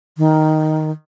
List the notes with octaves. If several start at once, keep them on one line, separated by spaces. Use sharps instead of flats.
D#3